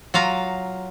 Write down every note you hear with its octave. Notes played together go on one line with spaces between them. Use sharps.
F#3 F4 F5 A#5